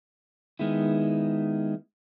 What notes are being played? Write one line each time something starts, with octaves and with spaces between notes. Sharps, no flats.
D#3 G#3 B3 E4